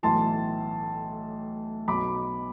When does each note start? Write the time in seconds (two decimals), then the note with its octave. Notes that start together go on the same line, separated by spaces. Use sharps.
0.03 B1 A2 E3 A5 C6
1.88 B1 B2 B5 D6